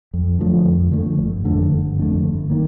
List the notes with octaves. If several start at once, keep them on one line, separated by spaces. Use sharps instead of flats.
F2
D3 F3 A3
F2
D3 F3 A3
G1
F2 D3 A3
G1
F2 D3 A3
G1
D#3 A#3